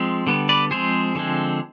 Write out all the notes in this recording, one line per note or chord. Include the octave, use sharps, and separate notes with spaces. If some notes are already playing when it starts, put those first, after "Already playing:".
Already playing: F3 G#3 C4
D3 G3 B3
B4 D5
F3 G#3 C4 G#4 C5
D3 F3 G#3 C4